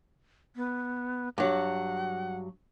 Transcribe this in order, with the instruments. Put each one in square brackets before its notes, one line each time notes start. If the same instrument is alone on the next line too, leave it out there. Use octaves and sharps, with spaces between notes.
[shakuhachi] B3
[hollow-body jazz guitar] G2 F#3 [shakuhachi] F#5